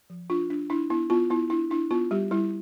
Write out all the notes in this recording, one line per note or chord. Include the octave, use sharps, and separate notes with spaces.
F3
D4 F4
D4
D4 E4
B3 E4
B3 F4
B3 E4
D4 E4
D4 E4
B3 F4
G3 G4
G3 E4